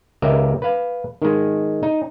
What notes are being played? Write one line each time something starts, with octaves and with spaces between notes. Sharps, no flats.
C#2 G4 A#4 D#5 E5
B4 F5
D#3 G#3
D#4